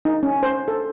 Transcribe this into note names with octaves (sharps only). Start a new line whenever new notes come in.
D#4
C#4
C5
A4